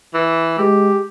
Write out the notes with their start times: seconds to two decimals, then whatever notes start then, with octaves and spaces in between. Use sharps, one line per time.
0.14 E3
0.58 G#3 G4